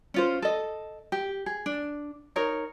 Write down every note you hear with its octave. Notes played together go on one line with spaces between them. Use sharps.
C#4 F4 C5
A4 D#5
G4
G#4
D4
D#4 A#4 C#5